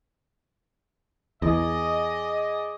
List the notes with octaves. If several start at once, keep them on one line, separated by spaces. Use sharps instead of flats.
E2 G#4 D5 D#5